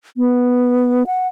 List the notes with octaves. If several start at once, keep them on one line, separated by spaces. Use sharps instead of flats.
B3
F#5